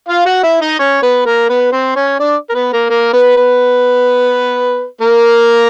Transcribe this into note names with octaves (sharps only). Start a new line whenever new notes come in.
F4 F5
F#4 F#5
E4 E5
D#4 D#5
C#4 C#5
B3 B4
A#3 A#4
B3 B4
C4 C5
C#4 C#5
D4 D5
A#4
B3 B4
A#3 A#4
A#3 A#4
B3 B4
B3 B4
A#3 A#4